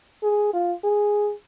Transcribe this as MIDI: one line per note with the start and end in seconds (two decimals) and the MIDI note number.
0.23 0.53 68
0.53 0.73 65
0.84 1.32 68